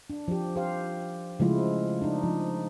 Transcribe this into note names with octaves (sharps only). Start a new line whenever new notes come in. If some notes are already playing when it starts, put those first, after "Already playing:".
D4
F3 G4
G4 C5 F5
C#3 F3 G#3 A3 E4 F4
D4 D#4
F3